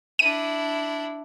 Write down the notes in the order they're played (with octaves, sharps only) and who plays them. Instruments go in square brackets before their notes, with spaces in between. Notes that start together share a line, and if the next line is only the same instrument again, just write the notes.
[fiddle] D4 E4 [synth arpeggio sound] D#7